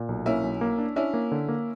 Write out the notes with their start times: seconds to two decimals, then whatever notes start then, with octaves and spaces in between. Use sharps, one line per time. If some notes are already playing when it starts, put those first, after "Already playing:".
Already playing: A#2
0.09 B1
0.26 A#3 C#4 E4
0.43 B1
0.61 A#3
0.78 D4
0.96 C#4 D4 E4
1.14 A#3
1.31 D3
1.48 A#3